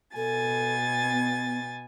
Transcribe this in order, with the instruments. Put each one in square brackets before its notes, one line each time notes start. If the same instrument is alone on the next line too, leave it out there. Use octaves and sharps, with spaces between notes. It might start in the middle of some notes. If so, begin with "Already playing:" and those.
[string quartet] B2 G#5 A6 [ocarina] A4
[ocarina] B3